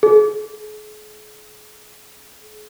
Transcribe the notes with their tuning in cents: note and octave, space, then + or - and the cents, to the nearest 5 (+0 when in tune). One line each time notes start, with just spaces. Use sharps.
G#4 +45